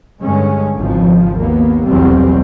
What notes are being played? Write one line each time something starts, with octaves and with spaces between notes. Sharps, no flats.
G2 D3 G#3 C#4
G#1 C#2 F3
D#2 A#3 B3
F1 B1 E2 F#3 G3 C4